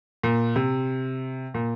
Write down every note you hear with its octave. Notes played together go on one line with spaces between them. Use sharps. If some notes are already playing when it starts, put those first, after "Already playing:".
A#2
C3
A#2